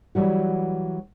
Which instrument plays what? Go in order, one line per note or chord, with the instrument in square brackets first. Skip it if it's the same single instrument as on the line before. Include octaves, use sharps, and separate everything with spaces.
[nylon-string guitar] E3 F#3 G3 F#4